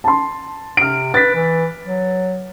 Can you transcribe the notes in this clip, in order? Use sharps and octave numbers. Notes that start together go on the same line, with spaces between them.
A5 C6
C3 F6 D7
B4 A6 B6
E3
F#3